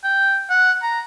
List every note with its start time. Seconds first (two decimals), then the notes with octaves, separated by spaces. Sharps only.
0.04 G5
0.50 F#5
0.83 A#5